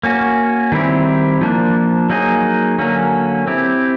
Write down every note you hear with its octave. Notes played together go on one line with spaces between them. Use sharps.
A#3 C#4 F#4
D#3 G3 C4 E4 G4
F3 A#3 D4
F#3 A#3 D#4 G#4
D3 F#3 A#3 C#4
C4 E4 G4